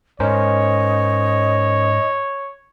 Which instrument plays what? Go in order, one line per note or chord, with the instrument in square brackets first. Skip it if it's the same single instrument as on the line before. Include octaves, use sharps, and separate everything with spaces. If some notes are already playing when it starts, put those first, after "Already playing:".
[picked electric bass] G#2 [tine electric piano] C#4 A#4 C5 [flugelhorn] C#5 [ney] D#5